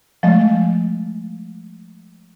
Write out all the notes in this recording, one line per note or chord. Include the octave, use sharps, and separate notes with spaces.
F3 G#3 A3 D#5